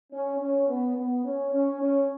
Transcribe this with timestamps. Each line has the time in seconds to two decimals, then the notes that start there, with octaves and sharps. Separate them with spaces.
0.13 C#4
0.40 C#4
0.69 B3
0.97 B3
1.25 C#4
1.53 C#4
1.82 C#4